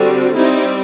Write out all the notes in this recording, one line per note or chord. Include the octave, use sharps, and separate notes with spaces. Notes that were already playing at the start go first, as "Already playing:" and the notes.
Already playing: D3 G3 C4 F#4
G3 C4 D#4 E4